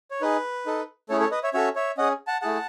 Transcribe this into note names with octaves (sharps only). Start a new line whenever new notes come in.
C#5
D#4 G#4 B4
D#4 A4
A3 C#4 E4 G#4 A4 C#5
A4 C#5
B4 D#5
C#5 E5
C#4 F#4 A4 C#5 E5
C#5 E5
C#4 G#4 D#5 F#5
F#5 A5
A3 E4 G#4 F#5 A5